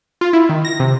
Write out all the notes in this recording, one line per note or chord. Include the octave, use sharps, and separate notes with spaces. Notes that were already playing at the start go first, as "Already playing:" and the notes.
F4
E4
D#3
A#6
C3